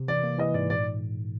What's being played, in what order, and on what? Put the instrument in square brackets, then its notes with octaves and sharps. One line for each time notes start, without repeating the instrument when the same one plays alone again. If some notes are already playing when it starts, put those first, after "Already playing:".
Already playing: [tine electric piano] C3
[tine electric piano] E3 [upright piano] D5
[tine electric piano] A#3
[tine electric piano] E3 [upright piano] D#5
[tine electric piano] G#2 [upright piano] D5
[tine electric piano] A#2 [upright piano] D5